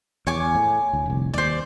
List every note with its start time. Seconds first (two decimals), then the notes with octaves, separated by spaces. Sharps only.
0.27 E2 C#5 G#5 D6
0.55 A2
0.93 D2
1.06 F1 C2
1.34 D#2 C5 D5